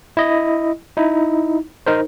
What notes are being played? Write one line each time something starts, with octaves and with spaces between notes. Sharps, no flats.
E4 D#5
D#4 E4
D#4 A#4 C5